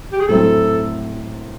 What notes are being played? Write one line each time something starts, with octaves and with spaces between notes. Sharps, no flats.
G4
G#4
A2 F#3 A3 C4 E4 A4